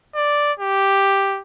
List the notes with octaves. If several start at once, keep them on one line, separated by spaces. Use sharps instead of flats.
D5
G4